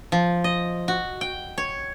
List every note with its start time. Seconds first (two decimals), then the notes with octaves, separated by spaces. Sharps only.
0.12 F3
0.44 D#5
0.88 F#4
1.21 G5
1.58 C#5